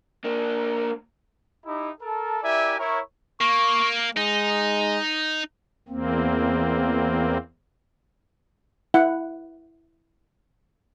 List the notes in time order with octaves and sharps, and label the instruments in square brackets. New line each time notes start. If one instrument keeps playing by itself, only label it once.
[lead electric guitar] A#3 D4
[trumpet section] D#4 E4 G4
A4 A#4 A5
E4 G4 A#4 D5 E5 G#5
E4 A#4 C#5
[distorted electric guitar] A#3 [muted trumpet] C#6
[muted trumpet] G#3 [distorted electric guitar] D#4
[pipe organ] E2 A#3 C4
[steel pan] E4 F#5